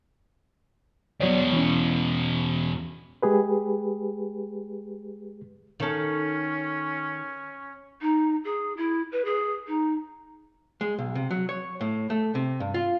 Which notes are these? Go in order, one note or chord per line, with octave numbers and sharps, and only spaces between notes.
E2 B2 F#3 C#5 D5
E3 C#4
G#3 G4 G#4 B4
D#3 C#4 A4
D#4
G#4
E4
B4
G#4
D#4
G#3
B1
C3
F#3
C#5
A2
A3
C3
G2
F4